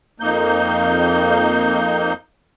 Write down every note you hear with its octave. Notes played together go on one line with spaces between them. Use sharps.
F2 A#3 D#4 G6